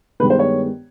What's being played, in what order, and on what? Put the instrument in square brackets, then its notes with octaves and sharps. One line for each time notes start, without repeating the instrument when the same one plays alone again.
[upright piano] G2 D#3 G#3 B3 B4
C5
C#5